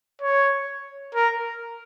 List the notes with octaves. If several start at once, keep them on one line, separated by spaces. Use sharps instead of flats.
C#5
A#4